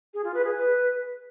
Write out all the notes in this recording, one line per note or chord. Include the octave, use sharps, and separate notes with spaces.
G#4
F4
B4
G#4
B4